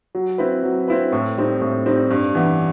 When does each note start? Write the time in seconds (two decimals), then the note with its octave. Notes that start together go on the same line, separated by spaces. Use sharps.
0.15 F#3
0.38 C4 E4 B4
0.63 F#3
0.88 C4 E4 B4
1.12 A2
1.38 G3 C4 D#4
1.61 A2
1.86 G3 C4 D#4
2.11 G2
2.35 E3 B3